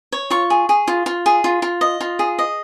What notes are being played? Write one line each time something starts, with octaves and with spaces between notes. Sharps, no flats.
C#5
F4 C#6
G#4
G#4
F4
F4
G#4
F4
F4
D#5
F4
G#4
D#5